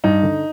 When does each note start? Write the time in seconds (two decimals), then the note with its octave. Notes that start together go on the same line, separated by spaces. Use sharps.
0.04 G2 D#4
0.23 D3